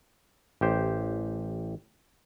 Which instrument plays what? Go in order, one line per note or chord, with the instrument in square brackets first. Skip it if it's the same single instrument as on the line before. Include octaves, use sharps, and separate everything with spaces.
[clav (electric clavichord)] A1 G4 C5